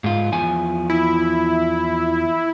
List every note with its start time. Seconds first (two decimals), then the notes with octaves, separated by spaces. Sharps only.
0.04 G#2 F4
0.32 E2 F3 G#5
0.90 E4